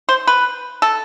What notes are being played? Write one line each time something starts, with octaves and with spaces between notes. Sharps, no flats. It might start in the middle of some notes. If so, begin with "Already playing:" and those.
C5
B4
A4